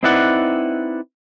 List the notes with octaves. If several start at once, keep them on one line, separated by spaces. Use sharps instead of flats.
C4 D#4 E4 B4 D5 F#5